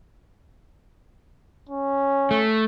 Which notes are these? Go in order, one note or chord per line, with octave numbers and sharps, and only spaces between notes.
C#4
A3